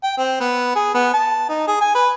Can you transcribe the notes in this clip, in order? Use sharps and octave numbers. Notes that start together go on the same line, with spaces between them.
G5
C4
B3
G#4
B3
A5
D#4
G#4
G#5
B4